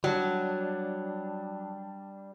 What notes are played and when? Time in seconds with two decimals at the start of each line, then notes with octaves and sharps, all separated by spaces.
0.04 F#3 G3 D4